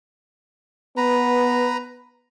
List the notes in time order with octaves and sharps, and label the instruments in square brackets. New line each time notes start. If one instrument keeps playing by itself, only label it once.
[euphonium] B3 [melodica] B4 A#5